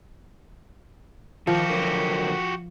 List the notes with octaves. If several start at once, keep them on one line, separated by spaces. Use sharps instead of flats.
D#3 F3 F#4 G4
D3 F#3 A#4